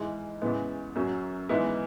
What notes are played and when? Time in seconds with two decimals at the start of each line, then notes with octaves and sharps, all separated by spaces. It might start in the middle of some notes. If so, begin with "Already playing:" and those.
Already playing: G#2 E3 G#3
0.42 E2 C#3 E3 G#3 B3
0.95 F#2 F#3 C#4
1.49 G#2 E3 G#3 B3 E4